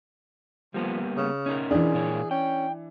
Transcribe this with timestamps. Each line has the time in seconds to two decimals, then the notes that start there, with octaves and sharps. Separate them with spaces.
0.74 F3 G3 A#3 B3
1.17 C#3
1.46 C#4 D#4 A#4
1.71 E3 D4 G#4
1.94 A#2 A#4 C#5
2.31 C#4 G5